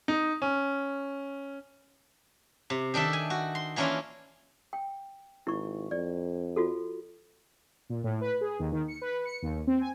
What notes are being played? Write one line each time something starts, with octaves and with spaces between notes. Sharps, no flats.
D#4
C#4
C3
D#3 D4 A4 E5
G#5
F#4
C6
E3 A#3 C#4 D4 E4 F4
G5
G#1 E4 C#6
F2 D5
F4 F#4 A4
A#2
A2
B4
G#4
D#2
D#3
C#7
B4
C#7
D#2
C4
G#5